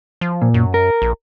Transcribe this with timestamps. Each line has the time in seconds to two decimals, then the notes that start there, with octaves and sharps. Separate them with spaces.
0.21 F3
0.42 A#2
0.54 F#2
0.74 A#4
1.02 A#1